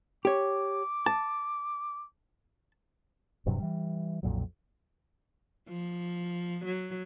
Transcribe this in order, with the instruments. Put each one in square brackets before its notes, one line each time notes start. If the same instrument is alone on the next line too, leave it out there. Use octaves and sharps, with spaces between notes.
[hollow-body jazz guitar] G4 C#5 [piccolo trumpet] D6
[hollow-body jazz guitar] A5
[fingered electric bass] D#1 G2 C3 F#3
E3 G3
B1 F2 A#2 F#3
[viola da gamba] F3
F#3